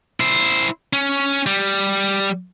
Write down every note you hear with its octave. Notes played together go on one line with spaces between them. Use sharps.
E4 C5
C#4
G3